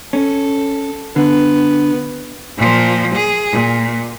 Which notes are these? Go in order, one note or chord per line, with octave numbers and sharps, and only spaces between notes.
C#4 A4
D3 B3
A#2 F3
G#4
A#2